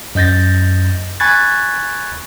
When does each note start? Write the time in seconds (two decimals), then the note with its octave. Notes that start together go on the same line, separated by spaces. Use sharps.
0.15 F#2 D#5 G6 A6 A#6
1.20 G#5 B5 C#6 F#6 G#6 A6